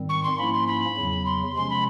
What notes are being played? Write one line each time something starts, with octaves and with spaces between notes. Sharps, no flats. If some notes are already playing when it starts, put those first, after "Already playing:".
Already playing: G#2 D#3 G3 C4
C#6
C6
G#2 F3 A#3 C#4 E4 B5
C6
B5
E2 C#3 F#3
C6
C3 F3 G#3 C#4 C6
B5